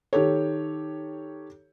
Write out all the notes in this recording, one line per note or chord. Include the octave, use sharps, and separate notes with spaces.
D#3 G4 A4 C#5